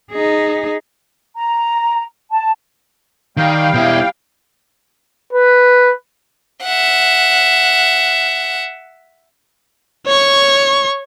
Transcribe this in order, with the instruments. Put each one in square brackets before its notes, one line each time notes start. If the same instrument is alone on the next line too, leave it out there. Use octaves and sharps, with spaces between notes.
[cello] D#4 G#4
[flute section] A#5
A5
[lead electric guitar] D#3 [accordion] G3 F5 G5
[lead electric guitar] B2 E4
[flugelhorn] B4
[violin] E5 F#5
[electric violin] C#5 C#6